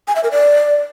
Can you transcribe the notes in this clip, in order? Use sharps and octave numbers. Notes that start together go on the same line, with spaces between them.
G#5
E5
A#4
D5